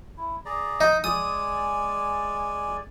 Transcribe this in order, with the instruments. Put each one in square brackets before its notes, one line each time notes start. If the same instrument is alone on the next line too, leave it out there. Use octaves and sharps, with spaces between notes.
[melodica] E4
G#4 D5 A#5
[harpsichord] D#4
[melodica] G#3 D5 G#5 [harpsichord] D#6